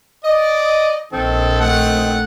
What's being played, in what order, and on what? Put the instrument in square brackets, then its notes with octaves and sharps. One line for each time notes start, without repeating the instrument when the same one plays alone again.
[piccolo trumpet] D5 [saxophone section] D#5
[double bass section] A#1 [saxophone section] D#3 C4 [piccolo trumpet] A4
[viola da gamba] A3 [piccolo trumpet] F#5